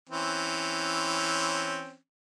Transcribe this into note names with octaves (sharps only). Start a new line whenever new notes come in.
E3 C4 C#4